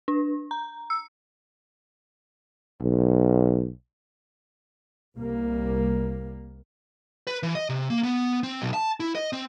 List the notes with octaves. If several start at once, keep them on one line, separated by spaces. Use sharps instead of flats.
D4
A#5
E6
B1
C2 G3 A#3
B4
E3
D#5
C3
A#3
B3
C4
B1
A5
E4
D#5
C4